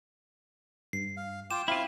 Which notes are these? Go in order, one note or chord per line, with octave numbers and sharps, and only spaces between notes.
G2 C7
F5
F4 G5 D6 E7
C4 E4 F4 F5 B5